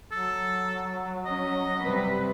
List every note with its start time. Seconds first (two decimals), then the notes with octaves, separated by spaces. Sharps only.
0.12 F#3 A4
1.25 C#4 D#5
1.82 C3 G3 B4